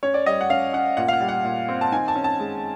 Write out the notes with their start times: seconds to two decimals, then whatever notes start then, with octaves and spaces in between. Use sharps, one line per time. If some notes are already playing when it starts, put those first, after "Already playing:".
0.03 C#4 C#5
0.14 D5
0.26 G3 D#5
0.41 F#5
0.49 C#4 F5
0.73 C#4 F#5
0.97 A#2 F#5
1.08 F5
1.13 F#5
1.20 G3
1.29 F#5
1.45 A#2
1.68 C4
1.81 A5
1.92 D#3 G#5
2.08 A5
2.15 C#4
2.24 A5
2.39 G#3